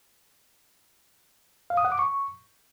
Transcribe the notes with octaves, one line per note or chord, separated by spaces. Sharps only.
F5
D#6
F#5
D6
C#6